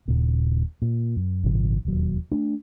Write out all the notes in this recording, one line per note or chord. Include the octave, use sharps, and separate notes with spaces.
D#1 A#2 C#3
A#2
F#2
G#1 A#2 C#3 F3
E1 D#2 F#3
A3 D4